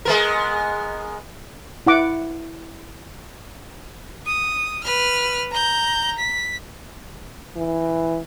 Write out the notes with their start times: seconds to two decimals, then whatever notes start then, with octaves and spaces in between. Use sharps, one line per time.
0.05 G#3 B3 A#4
1.87 E4 F#5 D6
4.26 D#6
4.84 B4 F6
5.51 A#5 G6
6.19 B6
7.56 E3